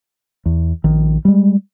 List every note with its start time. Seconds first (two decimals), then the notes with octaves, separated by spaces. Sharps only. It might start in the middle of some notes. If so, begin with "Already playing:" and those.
0.46 E2
0.84 A#1 D#3
1.25 G3 G#3